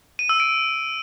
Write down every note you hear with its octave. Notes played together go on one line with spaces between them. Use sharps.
D#7
E6
D7